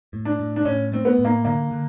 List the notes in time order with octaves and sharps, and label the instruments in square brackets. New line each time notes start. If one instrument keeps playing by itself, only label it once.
[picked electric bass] A2
[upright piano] D4
[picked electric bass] A2
[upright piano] D4
[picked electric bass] A2 [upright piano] C#4
[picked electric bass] A3 [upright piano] C4
[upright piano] B3
[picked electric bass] A2
[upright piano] A#3
[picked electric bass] D3 [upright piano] A#3
[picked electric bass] D3